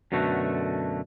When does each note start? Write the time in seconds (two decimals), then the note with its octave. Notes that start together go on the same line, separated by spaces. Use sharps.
0.12 F#2 B2 D3 A3 F#4